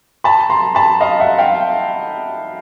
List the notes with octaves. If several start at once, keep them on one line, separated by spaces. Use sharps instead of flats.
A5 B5
A#5 C6
A5 B5
D#5 F5
E5 F#5
F5 G5